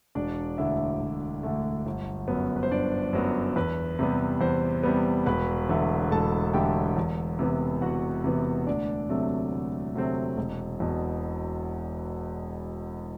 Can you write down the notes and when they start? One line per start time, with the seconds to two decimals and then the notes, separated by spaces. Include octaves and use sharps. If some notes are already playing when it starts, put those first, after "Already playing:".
0.15 E1 D4 D5
0.58 D2 D3 A3 E4 E5
1.01 E1
1.43 D2 D3 A3
1.86 G1
2.28 F#2 F#3 B3
2.56 B4
2.63 C5
2.71 G1 D4 D5
3.13 F#2 F#3 B3
3.56 E2 B4
3.99 C3 G3 B3
4.41 E2 C5
4.83 C3 G3 B3
5.26 E1 B4 B5
5.69 E2 D3 A3
6.11 E1 A4 A5
6.54 E2 D3 A3 G4 G5
6.97 E2
7.39 C3 E3 B3
7.82 E2 F#4 F#5
8.24 C3 E3 B3
8.67 D2 D4 D5
9.09 C3 F#3 A3 C4
9.52 D2
9.95 C3 F#3 A3 C4
10.37 E1
10.80 E2 B2